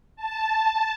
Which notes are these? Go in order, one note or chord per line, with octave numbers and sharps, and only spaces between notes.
A5